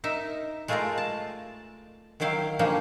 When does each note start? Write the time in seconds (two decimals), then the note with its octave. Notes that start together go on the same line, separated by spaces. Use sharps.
0.04 D#4 A#4 E5
0.68 G#3 A3 F4 A#4 D5 A#5
0.98 A5
2.20 D#3 F#3 E4 F5 G5
2.59 D3 F3 G3 A#3 C#4 D#4